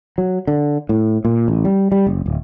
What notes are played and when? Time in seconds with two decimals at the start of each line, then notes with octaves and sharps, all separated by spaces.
0.18 F#3
0.47 D3
0.89 A2
1.25 A#2
1.48 A1
1.65 G3
1.92 G3
2.07 F#1
2.26 D1